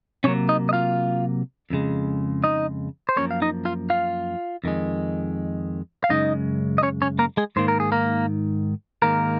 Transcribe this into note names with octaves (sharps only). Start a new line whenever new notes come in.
C3 F#3 A#3 C#4 C#5
D#4 D#5
D#5
F4 F5
F2 C#3 G#3
D#4 D#5
C5
F#2 F3 A#3 C#4 C#5
F5
D#4 D#5
F4 F5
F4 F5
F2 D#3 G#3
F5
F#2 C#3 G#3 D#4 D#5
D#5
C#4 C#5
C#4 C#5
A#3 A#4
G#3 G#4
G#2 D#3 A#3 C5
A#4
G#4
A#3 A#4
G#2 D#3 G#3 A#3 A#4